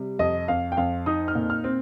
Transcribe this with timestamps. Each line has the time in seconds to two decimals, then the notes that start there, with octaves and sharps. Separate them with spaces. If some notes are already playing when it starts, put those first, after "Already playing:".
Already playing: C3 G3
0.19 F2 D#5
0.48 F2 F5
0.72 G5
0.77 F2 F5
1.06 D#4 D#6
1.28 F6
1.35 A#2
1.50 F6
1.64 C4